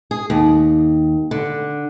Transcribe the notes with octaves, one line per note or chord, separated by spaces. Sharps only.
G#4
D#2
D3